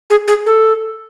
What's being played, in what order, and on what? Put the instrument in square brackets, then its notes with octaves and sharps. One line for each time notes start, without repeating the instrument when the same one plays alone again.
[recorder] G#4
G#4
A4